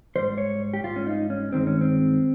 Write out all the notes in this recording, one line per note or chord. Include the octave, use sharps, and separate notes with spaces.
G#2 G3 C5
C#5
G4
G#2 G3 F4
C#4
D#4
C#4
G2 D#3 G#3 C4
C#4
C4